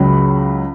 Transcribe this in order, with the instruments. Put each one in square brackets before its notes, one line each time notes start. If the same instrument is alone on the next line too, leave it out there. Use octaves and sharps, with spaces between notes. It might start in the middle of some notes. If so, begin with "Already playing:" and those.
Already playing: [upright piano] C#2 C#3 F#3 B5